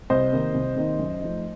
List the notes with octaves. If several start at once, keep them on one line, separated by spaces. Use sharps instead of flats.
C2 C5 D#5
C3 D#3 A#3 D#4
C2
C3 D#3 A#3 D#4
F#2
F3 A3 D#4